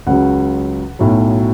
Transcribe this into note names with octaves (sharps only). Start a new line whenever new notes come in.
C#2 C#3 F#3 F#5
B1 A2 F#3